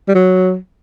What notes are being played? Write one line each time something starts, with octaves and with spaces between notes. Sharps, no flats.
G3
F#3